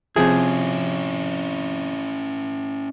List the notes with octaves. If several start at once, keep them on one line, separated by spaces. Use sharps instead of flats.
C3 F3 C#4 E4 G#4